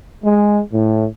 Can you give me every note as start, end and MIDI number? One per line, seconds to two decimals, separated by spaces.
0.23 0.60 56
0.72 1.06 45